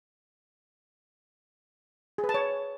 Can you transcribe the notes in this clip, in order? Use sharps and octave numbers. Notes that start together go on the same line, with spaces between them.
G#4
B4
A5
C#5